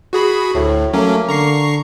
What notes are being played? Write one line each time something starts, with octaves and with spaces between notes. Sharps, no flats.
F#4 G#4 B5
D2 A2
F#3 A3 A#3 C#4
D3 A#5 C#6 C7